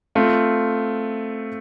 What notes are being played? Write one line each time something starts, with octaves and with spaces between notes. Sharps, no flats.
A3 C4 F4